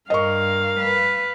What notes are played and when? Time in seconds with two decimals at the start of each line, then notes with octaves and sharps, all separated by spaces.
0.10 G2 A#4 D#5 F5 C#6
0.79 B4